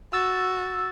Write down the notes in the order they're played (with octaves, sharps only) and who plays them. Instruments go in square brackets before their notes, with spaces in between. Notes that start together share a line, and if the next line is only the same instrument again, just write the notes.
[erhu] F#4 [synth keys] E6 A6